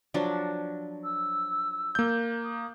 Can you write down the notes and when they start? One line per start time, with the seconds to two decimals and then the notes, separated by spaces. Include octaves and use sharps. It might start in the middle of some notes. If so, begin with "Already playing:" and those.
0.14 F3 F#3 D4
1.04 E6
1.95 A#3 G6
2.44 D#6